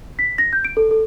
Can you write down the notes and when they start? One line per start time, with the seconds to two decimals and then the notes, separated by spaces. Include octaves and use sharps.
0.19 B6
0.38 A#6
0.53 G6
0.65 D7
0.77 A4
0.91 A4